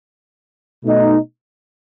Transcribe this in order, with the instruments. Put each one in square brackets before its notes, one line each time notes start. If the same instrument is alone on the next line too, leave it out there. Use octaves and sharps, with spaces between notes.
[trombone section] B2 A3 D#4